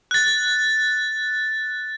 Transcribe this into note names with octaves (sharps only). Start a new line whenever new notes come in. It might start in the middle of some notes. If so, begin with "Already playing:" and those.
F#6 A6